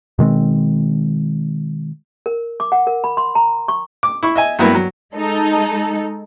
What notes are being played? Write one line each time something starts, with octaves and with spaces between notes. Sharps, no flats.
B2 D#3 G#3 C4
A#4
D6
F#5
A#4
B5
C6
A#5
C#6
D6
E4 C#6
D#5 E5 G#5
G2 F#3 A#3 B3 E4
F#3
G#3 D#4 A4